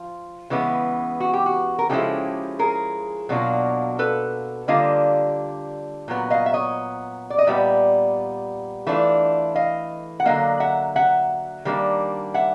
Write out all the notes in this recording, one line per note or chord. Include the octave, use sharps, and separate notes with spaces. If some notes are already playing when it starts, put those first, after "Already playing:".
Already playing: F3 F4
C#3 E3 G#3 B3
F#4
G4
F#4
A#4
C#3 F3 G#3 C#4 E4 G4 A4
G#4 A#4
B2 F#3 A#3 D4 F4
A4 B4
D3 G3 A#3 D4 F4 D#5 F5
A#2 F#3 B3
D#5 F5
E5
C#5 D#5
D5
D#5
A#2 G3 B3 D5 E5
E3 A3 D4 F4
D#5 F5
F#5
D3 F#3 A#3 D#5 F5
E5 F#5
E5 F#5
D#3 G3 A#3 D4
E5 F#5